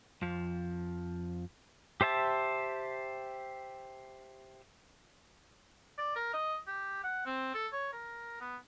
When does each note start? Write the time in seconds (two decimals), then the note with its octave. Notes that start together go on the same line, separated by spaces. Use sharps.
0.22 F2 F3
2.01 G4 C5 E5 A5
5.98 D5
6.16 A#4
6.34 D#5
6.67 G4
7.04 F#5
7.26 C4
7.54 A4
7.73 C#5
7.93 A#4
8.41 B3